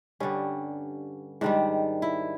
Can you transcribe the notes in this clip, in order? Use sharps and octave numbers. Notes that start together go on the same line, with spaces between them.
G2 D3 G3 C#4
G#2 D#3 G3 D4
E4